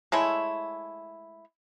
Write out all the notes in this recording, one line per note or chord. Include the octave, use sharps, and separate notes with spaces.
G#3 A3 E4 C#5